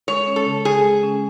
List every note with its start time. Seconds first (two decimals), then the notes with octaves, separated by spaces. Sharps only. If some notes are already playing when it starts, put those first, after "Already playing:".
0.08 G#3 C#5
0.27 C#4
0.36 A4
0.46 C#3
0.65 C#3 G#4
0.84 G#3
1.03 C#4